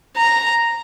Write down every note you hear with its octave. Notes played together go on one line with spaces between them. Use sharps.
A#5